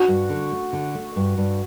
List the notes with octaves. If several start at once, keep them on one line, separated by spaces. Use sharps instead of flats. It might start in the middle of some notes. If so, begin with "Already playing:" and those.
Already playing: F#4
G2
D3
A3
D3
A3
G2
G2